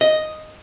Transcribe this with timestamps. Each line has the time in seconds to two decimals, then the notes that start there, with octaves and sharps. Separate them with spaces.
0.01 D#5